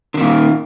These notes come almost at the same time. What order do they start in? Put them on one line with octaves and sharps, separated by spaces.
D3 D#3 A#2